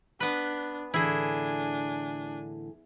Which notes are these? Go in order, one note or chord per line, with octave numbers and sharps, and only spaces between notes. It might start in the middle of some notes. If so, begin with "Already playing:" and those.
B3 D4 B4
A2 D3 E3 D4 E4 G#4 G#5